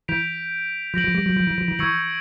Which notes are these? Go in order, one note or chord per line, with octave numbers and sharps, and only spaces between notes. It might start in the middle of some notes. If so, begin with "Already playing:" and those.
E3 G6 B6 D7 F7
F3 G6 A#6 D7 F#7
F3
G3
F#3
F3
E3
F3
E3
E3 C#6 E6 G#6 C#7 F#7